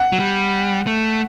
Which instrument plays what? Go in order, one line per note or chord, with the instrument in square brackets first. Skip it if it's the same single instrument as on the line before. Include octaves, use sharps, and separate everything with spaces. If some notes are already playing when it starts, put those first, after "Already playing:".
Already playing: [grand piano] F#5
[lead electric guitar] F#3
G3
A3